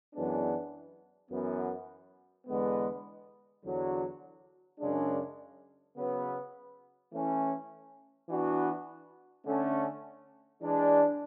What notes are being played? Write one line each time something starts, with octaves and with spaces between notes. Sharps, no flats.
F#2 E3 G#3 B3 D4
F#2 E3 B3
E2 D3 G#3 B3
E2 D3 F#3
F#2 C#3 G#3 D4
C#3 F#3 B3
E3 A3 C#4 E4
E3 B3 D4 F#4
D3 A3 C#4
E3 G#3 D4